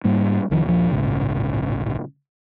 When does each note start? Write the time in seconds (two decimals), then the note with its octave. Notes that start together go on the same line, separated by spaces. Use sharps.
0.04 G#2 G3 A#3
0.50 F1 C2 D#3 F3
0.64 D#1 A#1 F3
0.91 D1 A#1 G#2 C#3